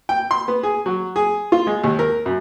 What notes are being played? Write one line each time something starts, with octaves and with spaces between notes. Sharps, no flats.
G5
C6
B3
G#4
F#3
G#4
F4
G#3
D#2
A#4
F#2